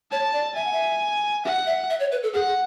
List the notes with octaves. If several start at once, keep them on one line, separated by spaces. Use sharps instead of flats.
C#5 A5
D5
E5 G#5
F#5
E5
E5 F#5
E5
E5
C#5
B4
A4
G#4 F#5